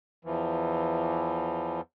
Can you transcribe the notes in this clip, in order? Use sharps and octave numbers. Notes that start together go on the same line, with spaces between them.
E2 E3 F3